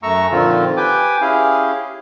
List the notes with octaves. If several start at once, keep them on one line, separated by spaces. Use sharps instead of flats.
F#2 A3 A#5 C#6 E6
A#2 D3 D#3 F3 C4 F4
G4 B4 G5 G#5 D6
C#4 E4 G4 G#4 F5